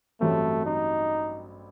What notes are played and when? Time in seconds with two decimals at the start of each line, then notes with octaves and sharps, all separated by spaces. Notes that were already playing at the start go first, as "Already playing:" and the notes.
0.20 A1 G2 F#3 A3 C4
0.66 D#4